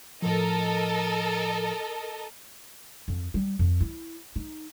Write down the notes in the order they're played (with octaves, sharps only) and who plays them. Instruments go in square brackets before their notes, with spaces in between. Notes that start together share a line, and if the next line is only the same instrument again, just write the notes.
[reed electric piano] A2 F3 [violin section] A4 A#4 D#5
[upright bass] F2
G3
F2
E4
D#4